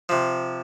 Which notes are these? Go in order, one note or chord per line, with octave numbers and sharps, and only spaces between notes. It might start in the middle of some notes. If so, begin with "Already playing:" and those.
C3 F3